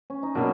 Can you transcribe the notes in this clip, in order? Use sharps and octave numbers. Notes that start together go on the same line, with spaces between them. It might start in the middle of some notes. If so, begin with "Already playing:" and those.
C#4
D#4
B2 F#3 A#3 D4